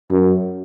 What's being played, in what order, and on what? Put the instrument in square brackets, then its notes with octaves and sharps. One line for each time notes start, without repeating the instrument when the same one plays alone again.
[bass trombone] F#2